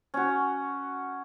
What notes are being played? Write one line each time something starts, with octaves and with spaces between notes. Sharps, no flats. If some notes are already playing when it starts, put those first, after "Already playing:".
C#4 F#4